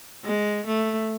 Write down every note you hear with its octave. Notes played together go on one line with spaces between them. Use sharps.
G#3
A3